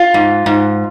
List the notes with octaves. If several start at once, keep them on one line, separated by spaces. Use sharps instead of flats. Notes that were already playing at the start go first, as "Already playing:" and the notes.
Already playing: F4
G#2
G#2